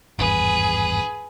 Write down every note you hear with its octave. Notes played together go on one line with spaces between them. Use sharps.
G#1 E2 G2 G#4 B4